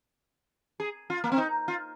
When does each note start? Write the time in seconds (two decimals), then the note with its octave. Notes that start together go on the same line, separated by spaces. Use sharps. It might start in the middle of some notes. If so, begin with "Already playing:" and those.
0.80 G#4
1.10 F4
1.24 A#3
1.32 C4
1.38 D#4
1.68 F4